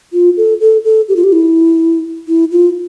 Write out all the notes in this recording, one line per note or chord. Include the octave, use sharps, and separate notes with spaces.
F4
A4
A4
A4
G4
F4
G4
E4
E4
F4